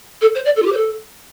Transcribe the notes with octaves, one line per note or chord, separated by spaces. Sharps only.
A4
C5
D5
A4
F4
G4
C5
A4